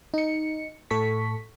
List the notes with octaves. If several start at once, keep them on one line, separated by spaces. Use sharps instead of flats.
D#4 C#7
A2 A4 C#6 B6